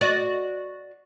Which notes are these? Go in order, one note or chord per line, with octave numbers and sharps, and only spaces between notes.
F#4 D5 D#5